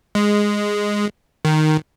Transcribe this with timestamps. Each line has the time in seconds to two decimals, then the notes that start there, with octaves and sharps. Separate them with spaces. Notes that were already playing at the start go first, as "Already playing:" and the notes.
0.15 G#3
1.45 D#3